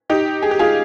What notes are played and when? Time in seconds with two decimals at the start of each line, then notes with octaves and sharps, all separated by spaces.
0.10 D#4 G4
0.42 G#4
0.51 G4
0.59 F4 G#4